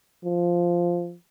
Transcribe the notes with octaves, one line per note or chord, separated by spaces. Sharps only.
F3